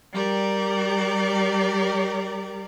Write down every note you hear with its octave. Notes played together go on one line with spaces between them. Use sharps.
G3 G4 A#4 D5